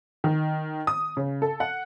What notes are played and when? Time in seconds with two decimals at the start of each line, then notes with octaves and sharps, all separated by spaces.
0.24 D#3
0.87 D#6
1.17 C#3
1.42 A4
1.60 F#5